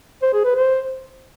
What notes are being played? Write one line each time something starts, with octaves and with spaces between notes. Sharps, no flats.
C5
G#4
B4
C5